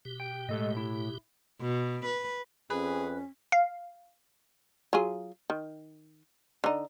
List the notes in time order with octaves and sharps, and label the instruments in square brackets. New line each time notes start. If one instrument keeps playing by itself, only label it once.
[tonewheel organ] B2 G4
[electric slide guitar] G5
[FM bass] A2 [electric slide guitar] G#3 A4 D#5
[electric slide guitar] E4
[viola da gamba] B2
B4
[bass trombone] F2 [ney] C#4 [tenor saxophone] G#4 [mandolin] B4
[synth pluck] F5
[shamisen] F#3 F4 G#4
D#3
D3 D#4